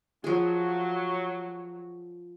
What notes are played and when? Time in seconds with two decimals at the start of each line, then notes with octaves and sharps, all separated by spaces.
0.24 F3 F#3 G#4